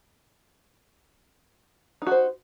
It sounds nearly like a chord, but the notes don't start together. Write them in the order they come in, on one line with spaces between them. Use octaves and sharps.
D#4 F#4 C5